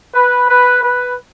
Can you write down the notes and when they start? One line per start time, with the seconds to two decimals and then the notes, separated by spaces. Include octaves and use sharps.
0.15 B4
0.49 B4
0.83 B4